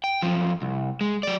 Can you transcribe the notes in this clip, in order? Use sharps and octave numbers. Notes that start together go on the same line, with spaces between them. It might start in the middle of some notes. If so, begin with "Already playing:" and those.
G5
F#2 F3
C2
G#3
F#3 D5